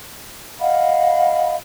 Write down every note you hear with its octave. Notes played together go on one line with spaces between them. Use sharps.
D#5 F5 F#5 B5